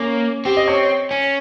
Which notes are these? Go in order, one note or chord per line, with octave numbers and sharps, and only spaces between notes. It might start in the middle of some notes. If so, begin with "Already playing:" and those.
Already playing: A#3 C#4
C4 G4
D#5
C#5
C#4